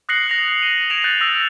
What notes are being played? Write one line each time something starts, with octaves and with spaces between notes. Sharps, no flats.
D#6 F#6 A#6 C7 C#7 F#7
A#6 F7
D#7 G7
G#6 A#6 C#7 D7 E7 F7
F#6 G6 A6 D7 D#7 F7
D#6 E6 A#6